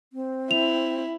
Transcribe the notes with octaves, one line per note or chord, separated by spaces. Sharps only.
C4
E4 F7